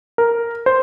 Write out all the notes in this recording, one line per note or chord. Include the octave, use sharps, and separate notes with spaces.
A#4
C5